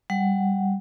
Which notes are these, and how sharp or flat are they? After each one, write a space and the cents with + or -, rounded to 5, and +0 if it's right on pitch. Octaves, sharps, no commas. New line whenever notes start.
G3 +0 F#5 +0